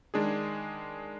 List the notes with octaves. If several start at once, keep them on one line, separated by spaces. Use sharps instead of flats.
D#3 G#3 D4 G#4